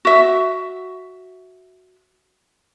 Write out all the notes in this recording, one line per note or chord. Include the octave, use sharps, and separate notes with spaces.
F#4 E5